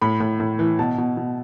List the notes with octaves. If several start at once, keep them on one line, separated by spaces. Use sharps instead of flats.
A2 B5
A2
A2
E3
B2 A5
B2
B2